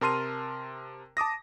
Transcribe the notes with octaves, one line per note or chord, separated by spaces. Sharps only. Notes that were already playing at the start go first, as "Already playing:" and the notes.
C3 A#4 A5 C6 F6 D#7
A5 D6 D#6 A#6